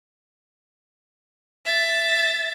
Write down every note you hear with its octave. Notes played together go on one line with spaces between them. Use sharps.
E5 A6